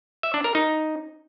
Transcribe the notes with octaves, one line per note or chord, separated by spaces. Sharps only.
E5
D4
A#4
D#4